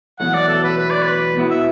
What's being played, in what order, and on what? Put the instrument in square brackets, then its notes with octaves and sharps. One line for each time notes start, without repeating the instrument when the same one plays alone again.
[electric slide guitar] E2 B2 F#3 A3 [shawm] F#5
[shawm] D5
A4
B4
B4
D5
B4
[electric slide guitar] B2 B3 E4
[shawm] E5